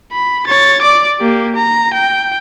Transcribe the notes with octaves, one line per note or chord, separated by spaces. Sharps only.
B5
C#5 A6
D5 D6
A#3 G4
A#5
G5